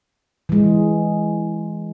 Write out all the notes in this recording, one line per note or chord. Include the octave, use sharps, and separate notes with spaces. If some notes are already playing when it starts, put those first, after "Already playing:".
E3 G#3